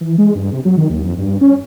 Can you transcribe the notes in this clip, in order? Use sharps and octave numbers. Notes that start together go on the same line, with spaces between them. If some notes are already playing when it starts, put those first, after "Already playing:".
E3
G#3
G2
C3
F#3
D#3
D#2
F2
G2
C#4